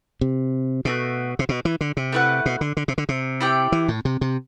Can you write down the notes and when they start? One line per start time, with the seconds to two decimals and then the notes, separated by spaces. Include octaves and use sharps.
0.21 C3
0.85 B2 A3 D4 F#4
1.39 C3
1.49 B2
1.65 E3
1.81 D3
1.97 C3
2.12 A3 E4 B4 F#5
2.46 B2
2.61 D3
2.77 D3
2.88 C3
2.98 D3
3.09 C3
3.41 E4 G4 D5 G5
3.72 E3
3.88 A2
4.05 C3
4.21 C3